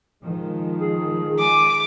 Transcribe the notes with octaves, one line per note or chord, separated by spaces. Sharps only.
D#3 F3 G#3
G#4
G#5 D6